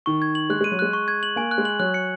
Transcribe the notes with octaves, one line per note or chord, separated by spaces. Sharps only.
D#3 C#6
G#6
F#7
G#3 F#6
G#3 D#7
F#3
G#3 F#6
C#6
G#6
F#7
A#3 G#5
F#6
G#3
F#7
F#3 F#6
C#7